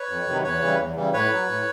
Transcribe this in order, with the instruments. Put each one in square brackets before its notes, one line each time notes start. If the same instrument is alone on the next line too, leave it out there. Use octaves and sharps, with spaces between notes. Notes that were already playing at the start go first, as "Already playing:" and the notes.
Already playing: [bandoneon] B4 C#5
F2
C3 D#3 F#3
E2 B4 C#5
C#3 E3 G3
E2
C#3 E3 G3
A2 B4 C#5
F#3
A2